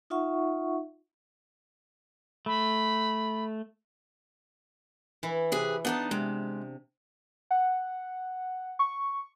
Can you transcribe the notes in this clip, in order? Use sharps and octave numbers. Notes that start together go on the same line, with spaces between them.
D#4 F4 E5 F#5 C#6
A3 B5
E3 E4
C3 G#4 B4
B3 D4 D#4 G#4 A5
C3 G#3
F#5
C#6